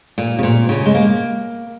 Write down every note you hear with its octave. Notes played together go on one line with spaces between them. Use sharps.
A#2
C#3
A#2
C#3
G#3
A#3